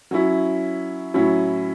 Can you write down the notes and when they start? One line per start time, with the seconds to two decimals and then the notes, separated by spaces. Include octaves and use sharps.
0.11 F#3 C#4 E4
1.14 A2 F#3 C#4 E4